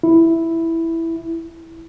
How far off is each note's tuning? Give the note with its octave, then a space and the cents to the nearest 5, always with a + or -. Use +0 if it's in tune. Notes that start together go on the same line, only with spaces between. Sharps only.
E4 +0